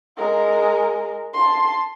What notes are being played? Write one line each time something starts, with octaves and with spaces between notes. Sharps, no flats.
G#3 A#4
A5 C6